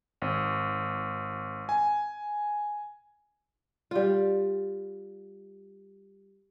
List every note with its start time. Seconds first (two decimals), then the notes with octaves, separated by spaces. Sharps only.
0.22 G#1
1.69 G#5
3.91 G3 F4